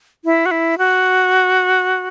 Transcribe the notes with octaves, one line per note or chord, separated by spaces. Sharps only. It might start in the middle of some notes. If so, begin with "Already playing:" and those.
E4
F#4
E4
F#4